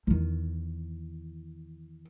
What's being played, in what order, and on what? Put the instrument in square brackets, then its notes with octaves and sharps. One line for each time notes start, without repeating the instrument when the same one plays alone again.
[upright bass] E2 D#3